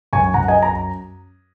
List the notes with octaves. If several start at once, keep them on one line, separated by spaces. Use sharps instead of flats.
F#2 G#5 C#6
F#2 F#5 A#5
D#5 G#5
A#5